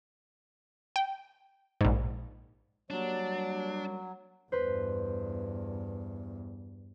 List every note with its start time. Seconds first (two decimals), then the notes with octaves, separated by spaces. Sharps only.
0.96 G5
1.81 A#1 G#2
2.90 F#3 G3 A#3 D4 C#5
4.52 E2 G2 B4 C5